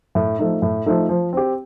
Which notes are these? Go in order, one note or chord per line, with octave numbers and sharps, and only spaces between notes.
A2
F3 A3 D#4
A2
F3 A3 D#4
F3
C4 G4